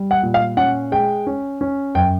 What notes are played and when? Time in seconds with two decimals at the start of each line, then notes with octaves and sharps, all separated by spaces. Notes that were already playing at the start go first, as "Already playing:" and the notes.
Already playing: G3
0.11 F#5
0.23 A#2
0.34 F5
0.57 C#4 F#5
0.92 G#3 G5
1.27 C#4
1.61 C#4
1.95 F#2 G5